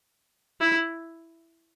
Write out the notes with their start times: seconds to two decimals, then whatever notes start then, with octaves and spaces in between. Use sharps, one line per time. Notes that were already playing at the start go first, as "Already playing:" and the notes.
0.61 E4